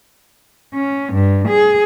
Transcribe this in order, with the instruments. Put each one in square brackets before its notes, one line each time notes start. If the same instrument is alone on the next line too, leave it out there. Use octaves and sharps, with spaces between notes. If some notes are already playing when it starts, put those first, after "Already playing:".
[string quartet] C#4
G2
G#4